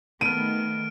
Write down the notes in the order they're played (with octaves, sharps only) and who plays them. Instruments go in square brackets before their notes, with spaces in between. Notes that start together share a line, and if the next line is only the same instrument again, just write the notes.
[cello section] D#3 B3 [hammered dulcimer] A3 [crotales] F6 D7 [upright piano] D#7